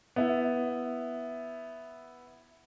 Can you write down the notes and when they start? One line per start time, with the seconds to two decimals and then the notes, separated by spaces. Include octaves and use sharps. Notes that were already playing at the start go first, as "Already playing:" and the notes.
0.16 B3 E4